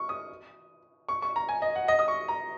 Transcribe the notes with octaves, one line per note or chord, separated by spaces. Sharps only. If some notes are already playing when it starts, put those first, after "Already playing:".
Already playing: C#6
D#6
C#6
C#6
A#5
G#5
D#5
F#5
D#5
D#6
C#6
A#5